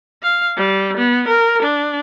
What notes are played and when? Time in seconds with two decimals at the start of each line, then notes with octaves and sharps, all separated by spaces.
0.23 F5
0.57 G3
0.97 B3
1.28 A#4
1.62 D4